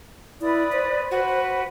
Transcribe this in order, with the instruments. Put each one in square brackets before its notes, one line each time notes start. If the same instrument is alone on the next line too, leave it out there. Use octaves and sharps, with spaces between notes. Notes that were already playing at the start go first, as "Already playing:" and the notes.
[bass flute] E4 [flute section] B4 D5 D#6
[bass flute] C5
[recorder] F#4 [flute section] B4